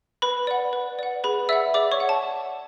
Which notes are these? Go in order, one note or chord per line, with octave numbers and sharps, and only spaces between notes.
B4 B5
D5 F#5
B4
D5 F#5
G#4 B4 B5
D5 E5 F#5 E6
G#4 D5 D6
C#5 C#6
D5 F#5
A5